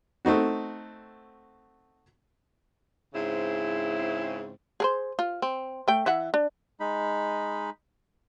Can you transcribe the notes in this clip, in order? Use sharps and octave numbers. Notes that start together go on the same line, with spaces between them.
A3 C4 D#4 F#4
G#2 C#3 C4 E4
G#4 A#4 C5
F4
C4
A3 G5
E3 E5 F#5
D4
G#3 D#4 B5